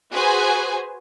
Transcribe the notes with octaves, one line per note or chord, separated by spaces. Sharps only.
F#4 G#4 B4 C5 G#5